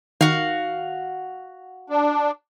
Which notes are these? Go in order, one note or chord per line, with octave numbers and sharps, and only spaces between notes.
D#3 F#4 F5
D4